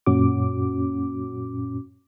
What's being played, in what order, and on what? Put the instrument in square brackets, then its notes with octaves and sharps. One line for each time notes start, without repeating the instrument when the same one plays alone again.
[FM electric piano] F#2 A#2 C#4 F#4 D6